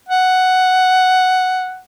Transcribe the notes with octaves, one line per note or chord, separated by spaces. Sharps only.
F#5